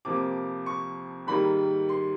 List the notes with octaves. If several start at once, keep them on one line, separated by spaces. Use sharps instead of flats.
F2 C3 F3 A#3 D6
C#6
G#2 D#3 G3 A#3 B5
C6